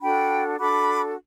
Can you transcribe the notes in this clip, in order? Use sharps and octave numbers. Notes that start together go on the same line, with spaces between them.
D4 F#4 A4 G5 B5
D4 F#4 A4 B5 D6